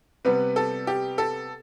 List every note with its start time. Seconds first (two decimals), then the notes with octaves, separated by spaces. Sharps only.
0.25 C3 G3 B3 B4
0.56 A4
0.87 G4
1.18 A4